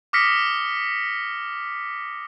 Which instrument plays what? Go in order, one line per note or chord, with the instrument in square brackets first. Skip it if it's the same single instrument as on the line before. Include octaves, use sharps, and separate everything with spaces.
[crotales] D6 D#6 F6 A#6 B6 C#7